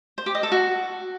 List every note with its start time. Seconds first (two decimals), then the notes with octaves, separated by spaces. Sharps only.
0.18 C5
0.26 G4
0.35 D#5
0.43 A4
0.52 F#4